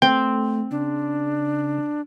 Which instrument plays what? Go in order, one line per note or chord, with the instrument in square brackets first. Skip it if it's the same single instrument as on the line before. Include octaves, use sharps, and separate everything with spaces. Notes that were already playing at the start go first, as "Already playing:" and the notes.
[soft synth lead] A3 [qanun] C4 [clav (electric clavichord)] G5
[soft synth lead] C#3 [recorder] D4